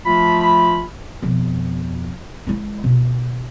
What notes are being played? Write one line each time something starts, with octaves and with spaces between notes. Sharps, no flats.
F3 A3 F4 B5
F2 B2
G#3 E4
B2